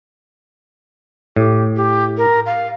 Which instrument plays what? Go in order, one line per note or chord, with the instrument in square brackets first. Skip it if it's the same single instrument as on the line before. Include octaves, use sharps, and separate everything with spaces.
[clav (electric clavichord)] A2 [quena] G4
[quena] G4
A#4
F5